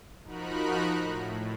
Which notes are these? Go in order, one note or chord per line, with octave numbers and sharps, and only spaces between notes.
F3 D#4 F#4 A#4 B5 F#6
A2